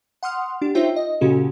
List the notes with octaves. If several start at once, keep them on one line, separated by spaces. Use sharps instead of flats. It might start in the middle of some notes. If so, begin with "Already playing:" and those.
F#5 C6 D#6 F6
D4 G4
D#4 F4 C5 C#5 E5 G5
D#5
A#2 C#3 C#4 F#4 G4 A4